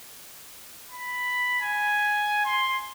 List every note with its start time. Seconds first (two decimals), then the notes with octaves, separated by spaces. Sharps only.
0.91 B5
1.62 G#5
2.45 C6